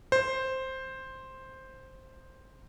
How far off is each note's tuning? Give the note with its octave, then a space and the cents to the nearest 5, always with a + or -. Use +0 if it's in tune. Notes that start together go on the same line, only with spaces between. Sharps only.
C5 +5